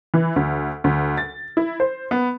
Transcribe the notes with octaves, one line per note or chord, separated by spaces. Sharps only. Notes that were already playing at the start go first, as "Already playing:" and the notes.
E3
D2
D2
A6
E4
C5
B3